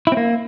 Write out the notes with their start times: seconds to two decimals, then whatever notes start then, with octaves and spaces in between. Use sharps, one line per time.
0.07 E4
0.12 C4
0.17 A#3